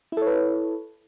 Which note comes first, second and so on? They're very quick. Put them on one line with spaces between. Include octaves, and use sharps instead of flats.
E4 A4 C#5 B4